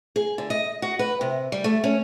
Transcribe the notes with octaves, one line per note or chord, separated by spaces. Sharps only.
G#4
D3
D#5
F#4
B4
C3
G3
A3
C#4